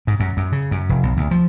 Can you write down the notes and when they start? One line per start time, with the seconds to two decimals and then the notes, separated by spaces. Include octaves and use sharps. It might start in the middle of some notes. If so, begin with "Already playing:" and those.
0.07 G#2
0.20 F#2
0.37 F#2
0.52 C#3
0.71 F#2
0.89 F1
1.03 B1
1.17 D2
1.31 F3